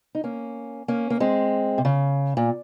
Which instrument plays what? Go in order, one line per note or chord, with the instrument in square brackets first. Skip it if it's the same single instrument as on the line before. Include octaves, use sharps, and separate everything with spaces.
[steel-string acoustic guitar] D#4
A#3 C#4
A#3 C#4
A#3
G#3 C4
C3
C#3
A#2